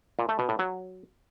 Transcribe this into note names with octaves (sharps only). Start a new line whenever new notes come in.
A#2
A3
B2
A2
F#3